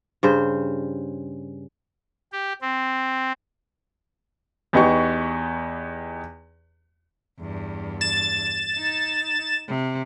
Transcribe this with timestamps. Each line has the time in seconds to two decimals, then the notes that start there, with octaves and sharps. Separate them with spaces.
0.23 G2 C#3 C5
2.32 G4
2.62 C4
4.73 E2 B3 D#4 G4 C#6
7.40 E2 G2
8.01 A6 E7
8.74 D#4
9.68 C3